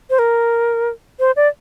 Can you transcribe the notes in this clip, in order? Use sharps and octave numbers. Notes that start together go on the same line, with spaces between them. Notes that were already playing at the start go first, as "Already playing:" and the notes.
C5
A#4
C5
D5